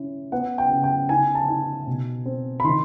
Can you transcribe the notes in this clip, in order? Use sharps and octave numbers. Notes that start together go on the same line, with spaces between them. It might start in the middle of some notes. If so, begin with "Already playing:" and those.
Already playing: C#4 E4
B3 F#5
G5
C#3
G5
D#4 G#5
A5
D#4
B2
C4
B5
D#3 C6